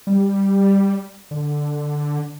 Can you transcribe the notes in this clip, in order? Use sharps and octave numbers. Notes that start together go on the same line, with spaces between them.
G3
D3